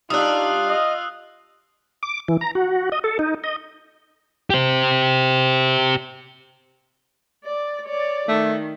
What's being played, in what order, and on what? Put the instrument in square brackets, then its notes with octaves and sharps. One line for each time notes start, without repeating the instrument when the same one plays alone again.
[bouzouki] G3 D4 [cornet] D#4 [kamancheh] F4 F5 [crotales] D#6 E6 F#6
[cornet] D#5
[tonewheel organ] D6
E3
A#5
F#4
D#5
A4
D#4
D#5
[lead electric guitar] G4 C5
[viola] D5
C#5 D5
[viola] D#3 [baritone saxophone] A3